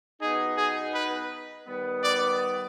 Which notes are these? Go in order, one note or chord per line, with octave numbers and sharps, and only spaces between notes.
B2 B3 D#4 G#4
G#4
B4
D#3 G3 B3
D5